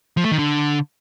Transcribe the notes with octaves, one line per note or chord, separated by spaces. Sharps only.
F3
A3
D#3
D3